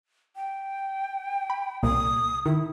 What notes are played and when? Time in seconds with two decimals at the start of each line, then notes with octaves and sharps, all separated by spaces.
0.36 G5
1.50 B5
1.83 C2 A#2 D#6
2.46 D#3 E4